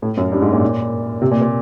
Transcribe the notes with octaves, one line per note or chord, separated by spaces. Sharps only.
A2
F#2
G2
G#2
A#2
C3
A#2
A#2